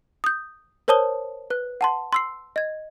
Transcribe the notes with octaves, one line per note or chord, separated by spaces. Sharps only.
D#6 G6
A#4 C5 C#5 A5 D#6 G7
B4 F#6
F#5 A5 C6
C6 E6 C7
D#5 G#6